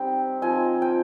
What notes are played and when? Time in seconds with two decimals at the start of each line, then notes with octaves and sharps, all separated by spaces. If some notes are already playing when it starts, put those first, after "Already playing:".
Already playing: G3 C4 D#4 G5
0.42 F3 C4 D#4 G#5
0.82 G5